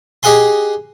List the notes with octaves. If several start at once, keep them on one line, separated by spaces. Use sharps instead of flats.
D#4 G4 G#4 F#5 G#5 C6